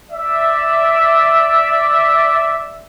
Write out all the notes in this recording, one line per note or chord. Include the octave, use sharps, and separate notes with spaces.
D5 E5